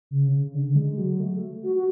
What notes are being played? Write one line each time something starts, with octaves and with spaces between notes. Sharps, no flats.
C#3
C#3
D3
G#3
F#3
A3
F#4
F#4